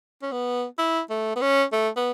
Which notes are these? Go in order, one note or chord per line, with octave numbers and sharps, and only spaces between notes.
C#4
B3
E4
A3
B3
C#4
A3
B3